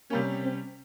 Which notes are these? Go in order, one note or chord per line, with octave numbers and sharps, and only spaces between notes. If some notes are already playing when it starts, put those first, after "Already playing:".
C3 G3 A#3 C#4
C4